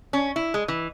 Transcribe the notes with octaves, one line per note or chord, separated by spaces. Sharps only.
C#4
E4
G#3
E3